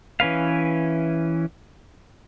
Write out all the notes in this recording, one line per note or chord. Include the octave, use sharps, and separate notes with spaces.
E3 C#4 B4 F5